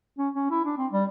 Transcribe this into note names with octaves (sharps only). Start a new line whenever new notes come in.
C#4
C#4
E4
D4
C4
G3